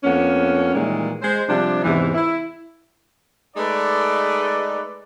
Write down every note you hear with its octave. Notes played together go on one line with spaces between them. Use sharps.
F2 A#3 B3 C#4
A#2 D#3 E3 G3 G#3
G#3 C5
C3 F3 G3 D4
E2 G#2 C3 E3
E4
G#3 A3 D#4 B4 D5